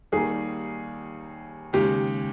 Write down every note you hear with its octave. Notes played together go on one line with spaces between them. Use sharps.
D#2 D#3 G3 A#3 D#4 G#4
D#2 C#3 G#3 D#4 G4